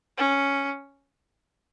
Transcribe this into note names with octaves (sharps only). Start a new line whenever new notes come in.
C#4